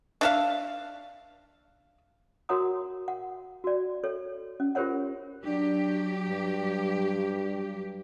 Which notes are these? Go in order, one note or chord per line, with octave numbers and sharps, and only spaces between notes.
D4 E5 F5
F#4 A#4 C#5 F#5 A#5 D#6
F#5
F#4 D5
A4 C#5
C#4
F4 G4 A#4 C5 C#5 F#5
F#3 D4 G4
G2